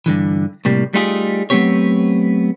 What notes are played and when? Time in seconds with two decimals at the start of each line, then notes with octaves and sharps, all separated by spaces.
0.06 G2 D3 E3
0.65 A2 C3 G3 A#3
0.94 G3 A3 D#4 F4 G4 G#4
1.50 F#3 A3 B3 C4 G4 C#5